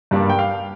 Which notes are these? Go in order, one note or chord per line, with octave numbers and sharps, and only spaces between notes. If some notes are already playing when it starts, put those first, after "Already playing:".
G2 G3 A#3 D4
G5
F5